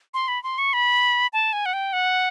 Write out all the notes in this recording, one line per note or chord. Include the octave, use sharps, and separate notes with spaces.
C6
B5
C6
C#6
B5
A5
G#5
F#5
G5
F#5